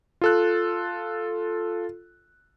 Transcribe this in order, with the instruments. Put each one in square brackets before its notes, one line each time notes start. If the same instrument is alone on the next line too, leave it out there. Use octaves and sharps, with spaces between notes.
[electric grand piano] F4 A4 F#6